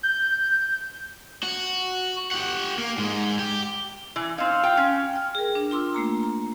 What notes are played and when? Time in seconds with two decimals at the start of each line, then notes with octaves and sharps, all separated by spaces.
0.03 G6
1.43 F#4
2.31 G4 F#5
2.78 A#3
2.97 G#2 G#3
3.39 G4
4.16 E3
4.38 C4 D#4 F5
4.63 F4 G5
4.77 C#4
5.13 G5 F6
5.35 G#4 A#4
5.55 D4
5.71 F4 C6 D6 E6
5.94 A3 A#3 A#5
6.23 A#5